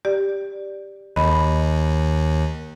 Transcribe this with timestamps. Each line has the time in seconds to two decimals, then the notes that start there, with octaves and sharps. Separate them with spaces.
0.05 G4 D5
1.16 D#2 D#5 B5